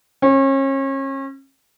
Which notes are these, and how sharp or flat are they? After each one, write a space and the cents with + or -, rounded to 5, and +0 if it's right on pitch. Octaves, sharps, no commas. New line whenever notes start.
C#4 -35